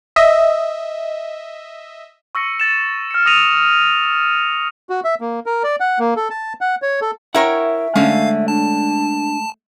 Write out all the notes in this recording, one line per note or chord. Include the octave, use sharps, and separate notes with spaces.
D#5 E5
C#6 E6 A#6 C#7
A6 E7
F6 C#7
D#6 A6 A#6 C#7 D#7 F7
F#4
E5
A#3
A#4
D5
F#5
A#3
A4
A5
F#5
C#5
A4
E4 A#4 C#5 E5 F#5 G5
D3 G#3 A3 C#4 F5
D4 A5